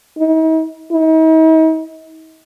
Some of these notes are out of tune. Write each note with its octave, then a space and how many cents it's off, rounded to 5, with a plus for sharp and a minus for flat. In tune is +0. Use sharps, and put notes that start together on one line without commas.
D#4 +45
D#4 +45